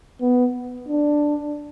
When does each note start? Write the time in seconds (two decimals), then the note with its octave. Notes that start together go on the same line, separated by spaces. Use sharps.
0.21 B3
0.88 D4